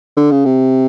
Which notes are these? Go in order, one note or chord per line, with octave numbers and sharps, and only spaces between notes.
D3
C#3
C3